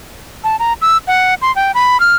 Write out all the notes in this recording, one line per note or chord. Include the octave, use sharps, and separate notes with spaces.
A5
A#5
E6
F#5
C6
G5
B5
F6